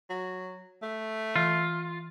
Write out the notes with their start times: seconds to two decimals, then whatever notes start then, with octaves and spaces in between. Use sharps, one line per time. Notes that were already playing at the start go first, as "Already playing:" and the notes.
0.10 F#3
0.82 A3
1.36 E3 F4